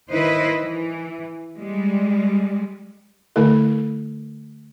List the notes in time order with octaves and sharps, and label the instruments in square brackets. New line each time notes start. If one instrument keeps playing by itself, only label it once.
[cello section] D#3 E4 B4 C5 D#5
E3
G3 G#3
[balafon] D3 A3 E4 A4